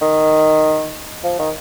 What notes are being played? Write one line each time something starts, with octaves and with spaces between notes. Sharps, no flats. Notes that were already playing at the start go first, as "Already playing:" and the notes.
D#3
F3
D#3